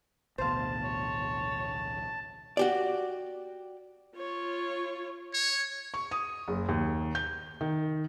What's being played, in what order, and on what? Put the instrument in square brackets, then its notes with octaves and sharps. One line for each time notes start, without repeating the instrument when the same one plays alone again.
[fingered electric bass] A1 D2 B2 [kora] C5 F5 [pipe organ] A5
[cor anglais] C#5
[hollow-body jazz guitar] F#4 G4 D5
[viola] F4 C#5
[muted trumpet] C#5
[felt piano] C#6
D#6
F#1
D#2
G6
D#3